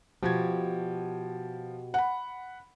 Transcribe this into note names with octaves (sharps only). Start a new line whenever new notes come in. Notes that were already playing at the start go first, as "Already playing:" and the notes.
B2 F3 F#4 G4 G#6
F#5 B5